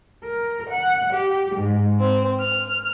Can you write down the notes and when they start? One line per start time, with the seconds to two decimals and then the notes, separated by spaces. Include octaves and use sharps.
0.23 A#4
0.70 F#5
1.12 G4
1.54 G#2
2.00 C4
2.40 F6